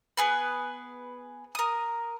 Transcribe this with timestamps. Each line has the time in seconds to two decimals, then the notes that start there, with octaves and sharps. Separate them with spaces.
0.17 B3 G#4 B4
1.55 A#4 D#6